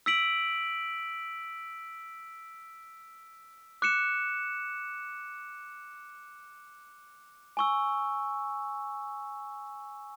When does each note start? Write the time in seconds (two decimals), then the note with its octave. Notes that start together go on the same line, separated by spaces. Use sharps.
0.06 E6 B6 D7 F#7
3.82 D6 F#6 C#7 E7
7.57 G#5 C#6 E6